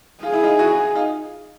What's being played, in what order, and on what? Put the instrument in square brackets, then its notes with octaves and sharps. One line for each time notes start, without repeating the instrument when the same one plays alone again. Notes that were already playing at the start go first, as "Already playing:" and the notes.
[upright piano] F4 [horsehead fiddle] G#4
[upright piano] E4
D#4 F4
E4 F#4
D#4 F4